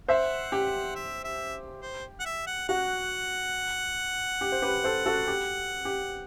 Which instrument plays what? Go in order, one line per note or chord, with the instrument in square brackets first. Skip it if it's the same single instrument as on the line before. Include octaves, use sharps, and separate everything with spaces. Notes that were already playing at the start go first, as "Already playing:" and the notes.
[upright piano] C5 E5 [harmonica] F#5
[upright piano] G4
[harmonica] E5
E5
C5
F#5
E5
F#5
[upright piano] F#4 [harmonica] F#5
[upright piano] G4
C5
G4 B4
A4 C5
F#4 A4
G4
G4